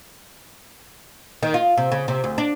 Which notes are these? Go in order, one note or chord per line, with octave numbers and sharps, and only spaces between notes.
D#3
F4
C3
C#3
C3
D2
D4